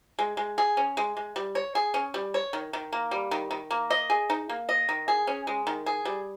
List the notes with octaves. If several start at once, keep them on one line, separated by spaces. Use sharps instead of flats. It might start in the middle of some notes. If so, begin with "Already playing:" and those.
G#3
G#3
G#4
C#4
G#3
G#3
G3
C#5
G#4
C#4
G3
C#5
D#3
D#3
A#3
G3
D#3
D#3
A#3
D#5
G#4
D#4
A#3
D#5
D#3
G#4
C#4
G#3
D#3
G#4
G3